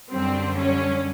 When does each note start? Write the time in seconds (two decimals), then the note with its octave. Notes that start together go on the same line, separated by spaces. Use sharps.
0.10 F#2 D3 G3 C4
0.58 C#4